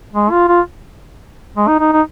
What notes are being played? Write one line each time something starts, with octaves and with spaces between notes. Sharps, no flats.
G#3
F4
F4
G#3
D#4
D#4
D#4